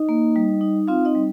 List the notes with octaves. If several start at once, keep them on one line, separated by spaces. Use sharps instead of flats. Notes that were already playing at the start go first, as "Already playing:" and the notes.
Already playing: D#4 D#5
A#3
G3
D#4
C4 F4 F5
D#4 D#5
G3